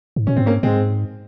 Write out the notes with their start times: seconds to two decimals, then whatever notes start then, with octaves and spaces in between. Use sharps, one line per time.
0.16 G#2
0.27 A#2 C#4
0.36 G#2 C4
0.46 A#3 C#4
0.63 G#2 G#3 C4